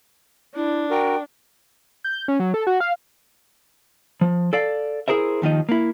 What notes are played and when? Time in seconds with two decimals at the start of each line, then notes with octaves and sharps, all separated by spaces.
0.56 D4 E4
0.90 F#4 A#4 G5
2.04 G6
2.28 C#4
2.40 F#3
2.54 A4
2.67 F#4
2.80 F5
4.21 F3
4.53 A4 D5 F5
5.08 E4 G#4 A#4 C5 E5
5.42 D#2 D#3 F3 D#5
5.69 A#3 E4